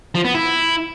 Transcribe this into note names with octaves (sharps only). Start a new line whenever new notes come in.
F3
B3
E4